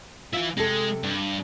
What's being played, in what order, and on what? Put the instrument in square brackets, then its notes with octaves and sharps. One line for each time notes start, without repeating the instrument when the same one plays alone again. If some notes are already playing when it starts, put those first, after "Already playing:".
[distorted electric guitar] E3 E4 [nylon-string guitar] F4
[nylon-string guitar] C3 A4 [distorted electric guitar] G#3
[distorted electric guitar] G2